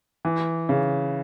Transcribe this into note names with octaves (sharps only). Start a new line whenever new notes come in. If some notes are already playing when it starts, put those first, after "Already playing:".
E3
C#3